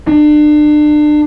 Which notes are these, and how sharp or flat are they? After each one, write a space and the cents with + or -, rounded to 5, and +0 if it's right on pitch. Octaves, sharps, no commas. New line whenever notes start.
D4 +35